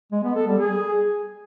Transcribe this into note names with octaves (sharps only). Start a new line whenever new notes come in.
G#3
B3
A4
G3
G#4